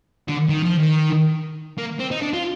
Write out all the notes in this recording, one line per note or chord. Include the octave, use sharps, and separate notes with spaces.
D3
D#3
F3
D#3
A#3
C4
D#4
D4
F4